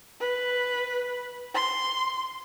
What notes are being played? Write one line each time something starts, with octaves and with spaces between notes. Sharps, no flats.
B4
C6